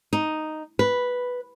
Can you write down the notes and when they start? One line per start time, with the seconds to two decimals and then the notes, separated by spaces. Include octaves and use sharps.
0.13 D#4
0.79 B4